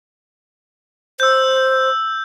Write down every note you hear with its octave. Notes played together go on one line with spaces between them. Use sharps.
C5 E6 G6